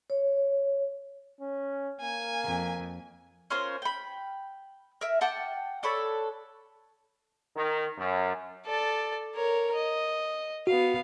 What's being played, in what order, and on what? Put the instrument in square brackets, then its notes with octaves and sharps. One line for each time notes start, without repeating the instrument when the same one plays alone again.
[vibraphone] C#5
[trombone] C#4
[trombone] A#3 [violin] G#5
[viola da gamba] F2
[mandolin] C#4 F4 A#4 C5
G5 B5
A#4 E5
F#5 G5 A5 D6
D4 A4 C#5 B5
[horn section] D#3
F#2
[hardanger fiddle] A4 D5
A#4 C#5
D#5
[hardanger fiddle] B3 F5 [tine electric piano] F#4